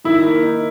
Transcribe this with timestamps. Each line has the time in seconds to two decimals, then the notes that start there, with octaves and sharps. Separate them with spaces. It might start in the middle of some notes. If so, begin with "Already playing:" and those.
0.04 D#3 E4
0.23 A#3
0.42 D#4